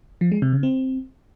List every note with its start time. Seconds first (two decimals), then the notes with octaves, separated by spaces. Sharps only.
0.21 F3
0.32 G#3
0.42 C3
0.53 C#3
0.63 C4